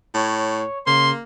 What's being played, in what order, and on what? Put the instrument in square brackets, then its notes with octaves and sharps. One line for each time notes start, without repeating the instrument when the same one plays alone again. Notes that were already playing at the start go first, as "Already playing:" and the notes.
[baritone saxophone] A2 [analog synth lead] C#5
[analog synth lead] C#3 [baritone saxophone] A#3 [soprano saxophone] C6